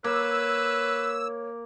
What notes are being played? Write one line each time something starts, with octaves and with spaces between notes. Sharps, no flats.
A#3 B4 C#5 E6